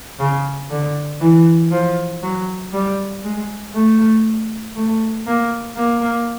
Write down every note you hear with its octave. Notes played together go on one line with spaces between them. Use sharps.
C#3
D3
E3
F3
F#3
G3
G#3
A3
A3
A#3
A#3